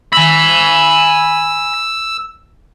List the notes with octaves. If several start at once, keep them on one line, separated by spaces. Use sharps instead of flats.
G#5 B5 E6